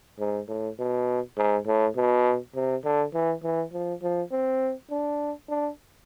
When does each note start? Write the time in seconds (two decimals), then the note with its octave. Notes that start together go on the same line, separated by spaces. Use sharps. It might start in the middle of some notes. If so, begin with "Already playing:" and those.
0.19 G#2
0.49 A2
0.79 B2
1.37 G#2
1.67 A2
1.96 B2
2.55 C3
2.85 D3
3.14 E3
3.43 E3
3.73 F3
4.02 F3
4.32 C4
4.91 D4
5.49 D4